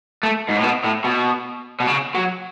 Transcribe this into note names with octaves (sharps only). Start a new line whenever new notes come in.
A3
G#2
A2
B2
A2
B2
B2
C#3
F#3